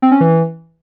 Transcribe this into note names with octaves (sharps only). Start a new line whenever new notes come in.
C4
C#4
E3